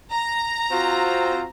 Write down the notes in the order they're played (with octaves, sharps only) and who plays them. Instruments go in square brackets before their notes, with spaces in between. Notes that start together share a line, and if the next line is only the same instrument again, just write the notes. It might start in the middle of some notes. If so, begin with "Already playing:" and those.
[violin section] A#5
[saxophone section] C4 F#4 [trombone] F4